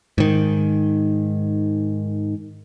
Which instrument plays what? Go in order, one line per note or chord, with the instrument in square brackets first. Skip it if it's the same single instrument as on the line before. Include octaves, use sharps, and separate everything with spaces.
[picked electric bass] G#2 D#3